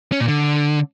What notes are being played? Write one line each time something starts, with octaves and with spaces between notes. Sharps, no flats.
C#4
A#2
D3